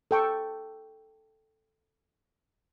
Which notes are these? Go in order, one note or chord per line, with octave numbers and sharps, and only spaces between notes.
A4 G5 C#6